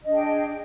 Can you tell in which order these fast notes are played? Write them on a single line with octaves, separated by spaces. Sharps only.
D#5 D4 G#4 G5